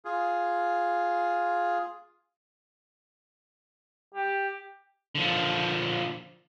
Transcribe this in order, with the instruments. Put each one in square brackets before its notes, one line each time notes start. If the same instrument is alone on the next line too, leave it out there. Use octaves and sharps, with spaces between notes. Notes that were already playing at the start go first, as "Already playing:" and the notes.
[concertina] F4 G#4
[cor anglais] G4
[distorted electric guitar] D3 F3